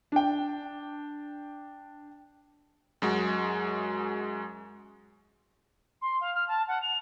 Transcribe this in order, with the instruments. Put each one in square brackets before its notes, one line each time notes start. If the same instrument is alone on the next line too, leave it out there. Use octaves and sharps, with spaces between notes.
[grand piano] D4 G5
[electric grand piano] F#2 G#3 F#4
[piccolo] C6
F5
F6
A5
F#5
F7